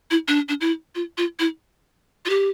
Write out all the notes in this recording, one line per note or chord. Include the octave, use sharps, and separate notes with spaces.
E4
D4
D4
E4
F4
F4
E4
F4
G4